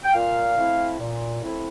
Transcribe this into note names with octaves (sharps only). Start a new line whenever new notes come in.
G5
A#2 F5
A3 C4 E4
A#2
A3 C4 E4